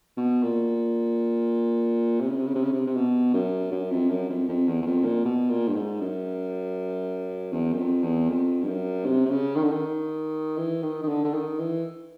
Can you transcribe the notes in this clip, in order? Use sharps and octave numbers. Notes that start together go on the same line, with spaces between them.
B2
A#2
C3
C#3
C3
C#3
C3
C#3
C3
C3
B2
F#2
F#2
F2
F#2
F2
F2
E2
E2
F2
A#2
B2
A#2
G2
G#2
F#2
E2
F#2
F2
E2
F2
G2
F#2
C3
C3
C#3
D#3
D3
D#3
E3
D#3
D#3
D3
D3
D#3
E3